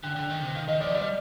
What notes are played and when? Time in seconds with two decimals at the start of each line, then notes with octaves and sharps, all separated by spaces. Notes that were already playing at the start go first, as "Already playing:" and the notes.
0.03 D3 G5
0.16 D3
0.30 D#3
0.42 C3
0.55 D#3 F5
0.68 D#3 D#5
0.81 F3 D5
0.95 G3 D5